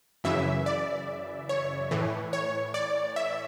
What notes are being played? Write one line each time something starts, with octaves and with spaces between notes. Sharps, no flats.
F#2 C#3 E3 E5
D5
C#5
A2 E3
C#5
D5
E5